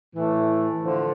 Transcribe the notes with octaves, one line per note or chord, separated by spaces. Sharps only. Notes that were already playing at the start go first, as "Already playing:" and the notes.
A2 E3 A3
D3 F3